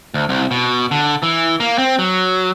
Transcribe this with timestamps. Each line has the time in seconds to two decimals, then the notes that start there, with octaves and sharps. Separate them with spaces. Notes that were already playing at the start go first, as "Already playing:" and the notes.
0.14 D2
0.29 C2
0.51 B2
0.91 D3
1.23 E3
1.60 A#3
1.78 C4
1.99 F#3